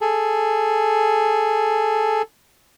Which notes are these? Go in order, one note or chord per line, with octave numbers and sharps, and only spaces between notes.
G#4 A4